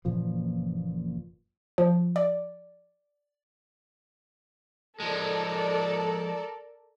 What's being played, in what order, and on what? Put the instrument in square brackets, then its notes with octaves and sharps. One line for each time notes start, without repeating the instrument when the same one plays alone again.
[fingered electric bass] F#1 A#2 E3 F3
[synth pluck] F3
D5
[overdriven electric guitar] F3 G#3 [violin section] A4 A#4 D5